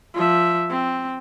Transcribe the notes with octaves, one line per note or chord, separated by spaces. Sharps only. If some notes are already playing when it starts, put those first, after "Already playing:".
F3 E5
C4